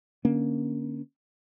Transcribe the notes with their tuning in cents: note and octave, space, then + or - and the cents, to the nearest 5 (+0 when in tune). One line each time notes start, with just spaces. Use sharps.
D3 +0 A#3 +15 C#4 +0